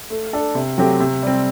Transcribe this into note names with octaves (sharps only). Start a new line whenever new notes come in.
A3
D4 A4
C3
F#3 A3 C4 G4
C3
G3 C4